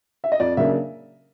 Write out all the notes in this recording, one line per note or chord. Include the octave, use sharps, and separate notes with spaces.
E5
D#5
F2 D5
C#3 F#3 A#3 D4 E5